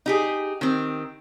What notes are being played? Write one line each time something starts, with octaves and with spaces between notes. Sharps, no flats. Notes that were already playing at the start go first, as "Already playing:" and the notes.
D#4 G4 G#4
D#3 C4